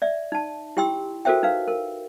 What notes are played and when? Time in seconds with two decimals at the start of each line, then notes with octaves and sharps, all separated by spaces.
0.02 D5 E5
0.32 D#4 A5
0.77 E4 G4 G5 C6 E6
1.25 F#4 A4 A#4 C5 E5 G5
1.43 D#4 B4 F5
1.68 A#4